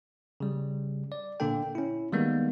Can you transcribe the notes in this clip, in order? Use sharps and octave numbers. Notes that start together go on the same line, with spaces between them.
C#3 G3
D5
A#2 D3 A#3 D4 A4 G5
C#4 E4
D#3 G3 G#3 A#3 B3 D#4